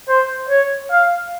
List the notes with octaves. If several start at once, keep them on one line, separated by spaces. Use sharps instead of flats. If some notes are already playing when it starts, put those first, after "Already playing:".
C5
C#5
F5